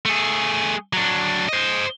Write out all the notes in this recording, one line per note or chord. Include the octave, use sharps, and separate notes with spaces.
A3 G#4
F#3 D4
C5 D#5